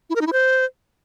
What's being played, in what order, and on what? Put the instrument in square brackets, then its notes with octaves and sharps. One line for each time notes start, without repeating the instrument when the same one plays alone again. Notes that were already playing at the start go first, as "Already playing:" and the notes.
[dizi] E4
A#4
D#4
E4
C5